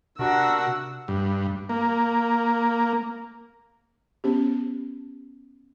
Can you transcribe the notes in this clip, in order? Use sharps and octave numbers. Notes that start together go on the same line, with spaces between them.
C3 D4 F#4 A#4 F#5 E6
G2
A#3
B3 C#4 G4